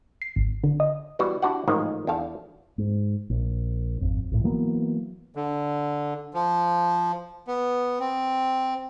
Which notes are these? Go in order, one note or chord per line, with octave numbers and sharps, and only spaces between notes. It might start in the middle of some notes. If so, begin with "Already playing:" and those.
C7
G#1
D3
D#5
E3 G3 B3 F#4
D4 E4 F#4 G4 D5 F#5
A1 G#2 D#3 F3 A#3 F5
E2 D4 A4 F5 A5
G#2
A#1
G#1 F2
A#1 A2
E3 F#3 A#3 B3
D3
F3
B3
C4